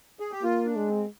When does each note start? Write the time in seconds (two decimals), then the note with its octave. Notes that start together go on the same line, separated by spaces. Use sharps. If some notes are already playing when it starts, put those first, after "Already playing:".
0.20 G#4
0.32 G4
0.43 A#3 F4
0.66 D4
0.76 G#3
0.88 C4